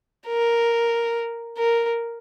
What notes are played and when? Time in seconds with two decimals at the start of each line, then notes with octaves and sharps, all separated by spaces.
0.27 A#4
1.58 A#4